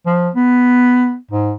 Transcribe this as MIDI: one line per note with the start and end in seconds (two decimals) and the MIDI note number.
0.06 0.29 53
0.35 1.15 59
1.31 1.53 44